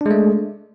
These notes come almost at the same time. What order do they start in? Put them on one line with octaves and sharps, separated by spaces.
D4 G#3 A3